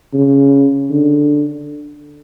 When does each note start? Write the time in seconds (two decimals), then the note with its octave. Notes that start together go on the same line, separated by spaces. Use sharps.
0.14 C#3
0.90 D3